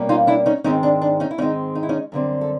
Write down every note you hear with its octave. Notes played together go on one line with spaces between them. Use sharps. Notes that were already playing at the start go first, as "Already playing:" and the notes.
Already playing: B2 G3 A#3 C#4
D#4 F4
D4 E4
C#4 D#4
G#2 D#3 G#3 C4 C#4 D#4
D4
D4
C#4 D#4
E4
G#2 D#3 G#3 C4 C#4 D#4
D#4
E4
C#4 D#4
F#2 D3 G3 C4
A4